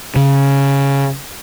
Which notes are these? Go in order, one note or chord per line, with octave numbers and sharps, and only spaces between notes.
C#3